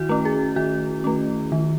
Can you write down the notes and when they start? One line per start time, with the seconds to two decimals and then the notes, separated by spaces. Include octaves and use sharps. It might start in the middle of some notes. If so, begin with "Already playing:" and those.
Already playing: D#3 E4 F#4
0.09 A3 C#4
0.25 G#4
0.56 D#3 F#4
1.04 A3 C#4
1.52 D#3